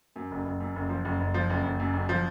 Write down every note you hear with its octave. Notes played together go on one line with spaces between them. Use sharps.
F#2
F#1
F#1
F#2
F#1
F3
F#1
F#1
F3
F#1
F#1
F#2
F#1
F3